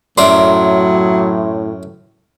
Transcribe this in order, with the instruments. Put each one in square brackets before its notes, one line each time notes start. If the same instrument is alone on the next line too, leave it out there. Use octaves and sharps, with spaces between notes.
[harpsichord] F#2 A#4 D5 [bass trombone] A2 [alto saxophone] F#3 [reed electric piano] E5 C6